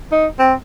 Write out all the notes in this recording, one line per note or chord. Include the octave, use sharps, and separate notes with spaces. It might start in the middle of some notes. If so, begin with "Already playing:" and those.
D#4
C4